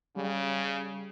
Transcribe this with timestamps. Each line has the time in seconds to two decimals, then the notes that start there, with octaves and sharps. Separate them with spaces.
0.16 C#3 G3